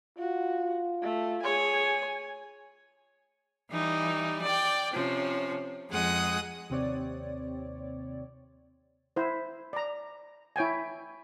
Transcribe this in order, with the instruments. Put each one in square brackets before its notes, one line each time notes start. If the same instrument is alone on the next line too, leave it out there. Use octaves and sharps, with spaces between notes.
[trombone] F4 [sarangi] F#4
[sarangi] A3
[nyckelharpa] G#4 C#5 [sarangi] G#5
[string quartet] E3 G3 D#4
D5 G5
C3 F3 C#4
F2 G#3 F#5 D#6
[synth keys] D#2 C3 C4 C#5 D5
[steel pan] E4 C5
D5 A#5
E4 C#5 G5 G#5